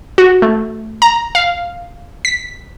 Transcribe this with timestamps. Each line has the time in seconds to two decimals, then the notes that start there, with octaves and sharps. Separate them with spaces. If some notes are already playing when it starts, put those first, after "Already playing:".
0.18 F#4
0.42 A3
1.02 A#5
1.35 F5
2.25 B6